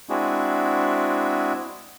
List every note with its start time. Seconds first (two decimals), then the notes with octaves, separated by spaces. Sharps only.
0.09 G#3 C4 D4 E4 F#4 G#4